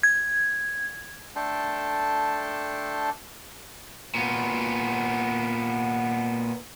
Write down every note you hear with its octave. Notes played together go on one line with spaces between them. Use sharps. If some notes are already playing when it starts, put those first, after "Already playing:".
G#6
A3 D4 A4 G5 A5 C6
A#2 B3